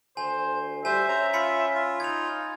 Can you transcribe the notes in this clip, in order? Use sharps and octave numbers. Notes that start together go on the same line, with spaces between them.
D2 C5 G#5
G3 C5 E5 G#5
C#4 C5 A#5
F4 G#5 B5 C#7
F4
D#4 G#6 F7